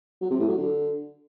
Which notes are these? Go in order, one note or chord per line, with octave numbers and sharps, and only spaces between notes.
F#3
C3
A2
F#3
D3